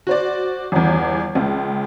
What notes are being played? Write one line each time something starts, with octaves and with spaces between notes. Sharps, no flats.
F#4 C5 D5
G1 E2
C#2